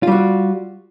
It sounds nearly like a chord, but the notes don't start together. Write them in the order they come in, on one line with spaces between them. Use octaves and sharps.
F4 G3 F#4